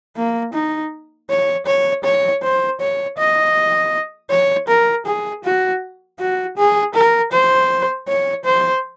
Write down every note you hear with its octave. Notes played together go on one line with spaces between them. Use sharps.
A#3
D#4
C#5
C#5
C#5
C5
C#5
D#5
C#5
A#4
G#4
F#4
F#4
G#4
A#4
C5
C#5
C5